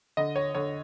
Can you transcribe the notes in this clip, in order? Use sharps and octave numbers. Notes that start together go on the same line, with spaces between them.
D3 D#5
C#5
D3 C#5